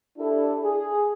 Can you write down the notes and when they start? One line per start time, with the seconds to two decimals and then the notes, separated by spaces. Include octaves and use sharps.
0.18 D4 E4 G4 A4
0.63 G#4